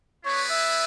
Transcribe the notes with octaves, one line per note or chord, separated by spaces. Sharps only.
B3 E4 G#4 B4 C#5 D5
E5